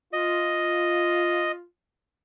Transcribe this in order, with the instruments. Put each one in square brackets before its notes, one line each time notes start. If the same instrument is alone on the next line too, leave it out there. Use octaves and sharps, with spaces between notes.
[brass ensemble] F4 [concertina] D#5